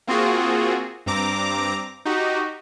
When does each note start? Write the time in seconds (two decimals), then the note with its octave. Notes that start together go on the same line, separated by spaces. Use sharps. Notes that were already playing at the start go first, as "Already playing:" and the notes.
0.07 A#3 C4 F4 F#4 G#4
1.06 G2 C4 A#5 D6
2.05 D#4 F#4 G4